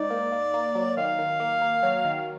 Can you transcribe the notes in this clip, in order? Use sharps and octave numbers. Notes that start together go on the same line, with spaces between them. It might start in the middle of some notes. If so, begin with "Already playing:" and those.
Already playing: G#2 D#4 D5
A#3
A#3
A#3
F#3
D#3 F5
D#3
A#3
A#3
F#3
D#3